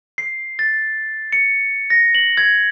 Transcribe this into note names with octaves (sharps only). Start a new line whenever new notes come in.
C7
A6
C#7
A#6
F#7
G#6